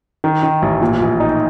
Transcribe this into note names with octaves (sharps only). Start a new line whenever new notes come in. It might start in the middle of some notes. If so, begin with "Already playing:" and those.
D#3
D#3
A1
A#2
A#1
D#4